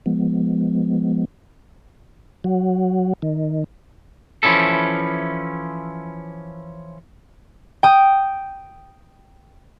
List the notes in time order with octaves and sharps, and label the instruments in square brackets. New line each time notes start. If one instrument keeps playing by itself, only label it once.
[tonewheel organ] F3 G#3 B3
F#3
D#3
[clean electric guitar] E3 F3 C#4 E4 A4
[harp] G5 D#6